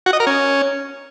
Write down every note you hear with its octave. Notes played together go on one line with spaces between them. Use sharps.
F#4
D#5
A#4
C#4